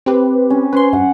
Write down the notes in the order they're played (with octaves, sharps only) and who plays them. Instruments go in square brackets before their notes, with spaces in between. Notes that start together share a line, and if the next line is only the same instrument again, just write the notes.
[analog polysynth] C4 G4 B4
[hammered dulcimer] C#4
[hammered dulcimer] C#4 [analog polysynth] B4 C5 C6
[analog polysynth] G2 [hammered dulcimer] F#5